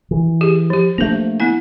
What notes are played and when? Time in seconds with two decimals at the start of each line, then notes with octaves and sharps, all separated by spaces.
0.11 E3
0.41 G4 G#4
0.70 F3 G4
0.98 A3 A#3 D4 C5
1.40 B3 E4 G#5